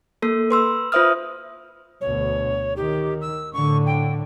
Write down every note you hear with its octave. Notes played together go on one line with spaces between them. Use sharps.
A#3 A4
B4 C6 E6
F4 B4 C5 E5 D#6 F6
D2 B2 C#5
D#3 G4
E6
A2 D3 C#6
G5